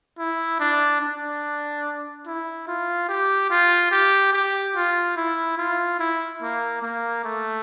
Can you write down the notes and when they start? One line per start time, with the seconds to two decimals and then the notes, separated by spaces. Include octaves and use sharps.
0.18 E4
0.60 D4
1.01 D4
2.27 E4
2.68 F4
3.09 G4
3.50 F4
3.92 G4
4.33 G4
4.76 F4
5.17 E4
5.58 F4
5.99 E4
6.42 A#3
6.83 A#3
7.24 A3